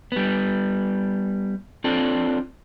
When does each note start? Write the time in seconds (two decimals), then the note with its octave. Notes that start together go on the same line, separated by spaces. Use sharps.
0.12 G3 B3
1.84 C4 D4 F4 A4